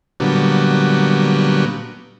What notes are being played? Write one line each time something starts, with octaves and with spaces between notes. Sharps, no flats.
A#2 D3 F#3 G3 B3